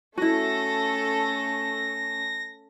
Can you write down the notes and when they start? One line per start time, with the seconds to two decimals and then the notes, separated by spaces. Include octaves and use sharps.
0.17 A3 C#4 E4 F#4 A4 A#6